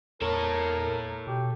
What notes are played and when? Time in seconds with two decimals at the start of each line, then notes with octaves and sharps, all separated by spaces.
0.22 E2 A4 A#4 C#5
1.27 B2 G4